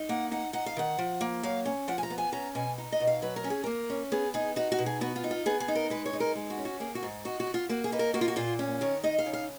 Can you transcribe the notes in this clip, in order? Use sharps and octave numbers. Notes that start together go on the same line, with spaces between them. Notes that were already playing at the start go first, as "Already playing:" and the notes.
Already playing: D#4
A#3 F#5
D#4 F#5
D#4 F#5
F5
D#3 F#5
F3
A#3
F#3 F5
C#4
F3 F#5
G#5
A#5
B3
G#5
C#4 A#5
B2 G#5
D#4
D#5
B2
F5
F#3 B4
A#4
C#4
G#4
A#3 A#4
C#4
B3 G#4
D#4 G#4
D#4 F#4
F#4
B2
G#4
B3 F#4
F4
D#4
F4
B3 G#4
G#4
D#4
A#4
G#3 B4
C#5
D#4
A#4
G#3
F#4
C#4
F#4
A#3 G#4
F#4
G#2
D#4 F#4
F#4
B2
F4
A#3 F#4
G#4
D#4 B4
A#4
A#3 F#4
F4
F#4
A#2 F4
C#4
D#3 C#5
D#4 D#5
F5
C#3
F5